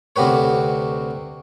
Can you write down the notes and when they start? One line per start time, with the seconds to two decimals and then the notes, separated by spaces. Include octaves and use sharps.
0.16 D2 C3 F#4 G4 B4 C#5